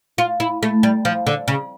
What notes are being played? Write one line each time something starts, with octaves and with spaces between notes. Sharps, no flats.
F4
E4
A3
G3
F3
D3
C#3